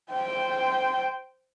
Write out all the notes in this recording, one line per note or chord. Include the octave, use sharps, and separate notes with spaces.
C5 G5